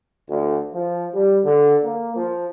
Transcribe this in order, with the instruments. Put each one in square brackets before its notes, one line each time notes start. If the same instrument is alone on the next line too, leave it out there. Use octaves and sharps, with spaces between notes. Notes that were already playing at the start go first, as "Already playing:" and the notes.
[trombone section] D2
F3
G3
D3
A#3
F3